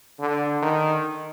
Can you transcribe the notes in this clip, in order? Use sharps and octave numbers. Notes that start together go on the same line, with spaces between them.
D3
D#3